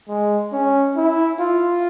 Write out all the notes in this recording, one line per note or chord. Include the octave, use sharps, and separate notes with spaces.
G#3
C#4
E4
F4